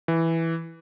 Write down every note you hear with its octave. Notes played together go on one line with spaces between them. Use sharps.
E3